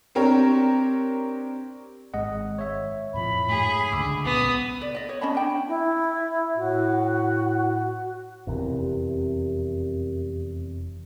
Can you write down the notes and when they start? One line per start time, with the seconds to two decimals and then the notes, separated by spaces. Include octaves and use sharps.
0.15 C4 D4 G4 A#4 C#5
2.14 G#1 G#3 D#5 F#5
2.59 C#5 E5
3.14 F2 A2 F3 B5
3.49 G#2 A3 G#4
3.92 C#2 D3 D6 E6
4.25 A#1 C#3 B3 D#6
4.81 D5
4.95 D5 D#5
5.09 C#5
5.21 C#4 D#5 A5 B5
5.35 D4 G5
5.68 E4
6.57 A2 F#4
8.47 F1 E2 C3 G4 A#4